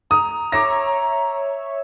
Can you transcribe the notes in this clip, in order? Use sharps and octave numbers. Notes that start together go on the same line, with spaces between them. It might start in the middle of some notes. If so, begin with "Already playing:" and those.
A#5 D#6
C#5 E5 D6 A#6